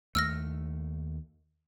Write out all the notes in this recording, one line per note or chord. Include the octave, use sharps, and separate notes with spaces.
D#2 A3 E6 F6 A#6